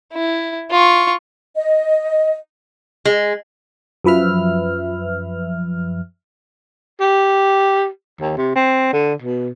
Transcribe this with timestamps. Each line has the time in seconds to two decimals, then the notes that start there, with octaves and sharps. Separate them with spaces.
0.13 E4
0.71 F4 C#6
1.55 D#5
3.05 G#3
4.04 F#2 F3 B4 E5 F6
7.00 G4
8.20 D#2
8.37 C3
8.55 C4
8.93 D3
9.22 B2